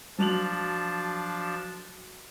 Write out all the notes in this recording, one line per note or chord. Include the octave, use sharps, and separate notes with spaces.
F3 F#3 D4 A5 F7 F#7